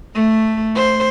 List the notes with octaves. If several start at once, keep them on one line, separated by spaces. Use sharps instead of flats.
A3
C5